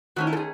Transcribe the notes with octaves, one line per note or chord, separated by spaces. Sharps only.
D#3 A3 C#4 F#4
E4
A4
G#4